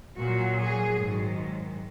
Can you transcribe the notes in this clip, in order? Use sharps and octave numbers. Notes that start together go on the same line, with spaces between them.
A#2 F#3 F#4
G#4
G#2 D#3 F#3